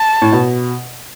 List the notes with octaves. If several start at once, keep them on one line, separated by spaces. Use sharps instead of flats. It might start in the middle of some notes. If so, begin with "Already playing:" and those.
Already playing: A5
A2
B2